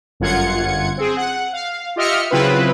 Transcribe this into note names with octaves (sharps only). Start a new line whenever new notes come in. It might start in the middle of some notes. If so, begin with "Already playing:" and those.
G1 F#2 F4 F#5 G#6 C#7
C4 G#4
F#5
F5
F4 G4 D#5 E5 F6 C#7
C#3 F#3 C4 E4 F4 B4